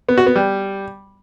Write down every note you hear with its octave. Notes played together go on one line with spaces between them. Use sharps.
B3
F#4
B3
G3